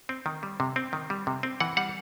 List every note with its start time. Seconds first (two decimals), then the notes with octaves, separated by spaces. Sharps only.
0.09 C4
0.26 D#3
0.43 G3
0.60 C3
0.76 C4
0.93 D#3
1.10 G3
1.27 C3
1.43 C4
1.60 E3 F#5
1.77 G3 F#5